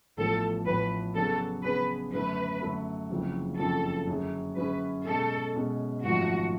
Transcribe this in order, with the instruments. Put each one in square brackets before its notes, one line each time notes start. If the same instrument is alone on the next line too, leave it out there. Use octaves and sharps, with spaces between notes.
[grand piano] A1 A2 F3 B3 [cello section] A4
[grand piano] A1 A2 F3 B3 [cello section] B4
[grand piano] C#3 F#3 B3 D4 G#4 [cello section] A4
[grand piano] C#3 F#3 B3 D4 G#4 [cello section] B4
[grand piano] F#2 D3 F#3 A3 [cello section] B4
[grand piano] F#2 D3 F#3 A3
F#1 F2 C#3 F#3
[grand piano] F#1 F2 C#3 F#3 [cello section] A4
[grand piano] F#2 D3 F#3 C#4 G#4
[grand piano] F#2 D3 F#3 C#4 G#4 [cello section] B4
[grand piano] B2 G#3 C#4 G#4 [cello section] A4
[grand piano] B2 G#3 C#4 G#4
[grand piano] G#1 F#2 F3 A3 F4 [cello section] F#4